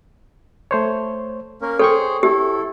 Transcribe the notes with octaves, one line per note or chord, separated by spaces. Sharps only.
A3 C5 C#5
A#3 C#4 A#4
G#4 A4 C5 C#5 G5 C#6
E4 G4 A4